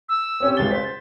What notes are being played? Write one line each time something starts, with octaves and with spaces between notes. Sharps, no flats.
E6
C4 C#4 G4
C#2 A6 G7
C5 B6